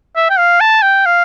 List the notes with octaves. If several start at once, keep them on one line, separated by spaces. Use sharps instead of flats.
E5
G5
F5
A5
G5
F5